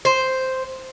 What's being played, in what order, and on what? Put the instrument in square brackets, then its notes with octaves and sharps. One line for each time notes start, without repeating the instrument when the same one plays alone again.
[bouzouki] C5